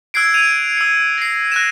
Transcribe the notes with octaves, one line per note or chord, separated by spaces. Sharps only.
E6 F#6 G#6 C7 D7
G#6 D#7 F7
E6 C#7
A#6 C7
F#6 A#6 E7